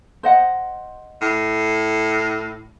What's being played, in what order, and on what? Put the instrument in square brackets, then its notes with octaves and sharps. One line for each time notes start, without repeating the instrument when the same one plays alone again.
[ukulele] C5 D#5 F#5
[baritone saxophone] A2